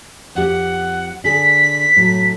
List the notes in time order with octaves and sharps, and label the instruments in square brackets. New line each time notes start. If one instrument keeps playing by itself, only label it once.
[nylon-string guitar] F2 G4 [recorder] F#5
[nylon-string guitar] D3 G#4 [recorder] B6
[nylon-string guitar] A2 F#3